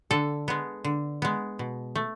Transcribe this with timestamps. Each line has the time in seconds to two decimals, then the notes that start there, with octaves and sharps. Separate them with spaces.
0.11 D3 A4
0.48 G#3 B3
0.84 D3
1.22 G#3 B3
1.59 B2
1.95 A3